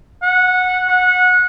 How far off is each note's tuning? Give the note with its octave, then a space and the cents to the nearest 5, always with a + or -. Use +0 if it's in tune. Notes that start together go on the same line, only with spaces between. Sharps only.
F#5 -15
F#5 -25